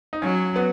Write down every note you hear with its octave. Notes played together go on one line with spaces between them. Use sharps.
D#4
F#3 C#4
B3